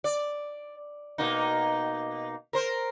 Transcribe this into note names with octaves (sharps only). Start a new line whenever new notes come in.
D5
B2 A#3 D#4
A#4 C5